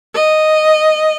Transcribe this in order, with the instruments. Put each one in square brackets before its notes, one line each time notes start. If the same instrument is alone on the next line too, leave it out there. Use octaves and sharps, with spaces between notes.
[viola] D#5